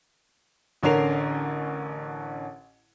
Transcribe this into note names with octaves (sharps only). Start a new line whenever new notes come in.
A1 D3 C#4 A#4 C7 F7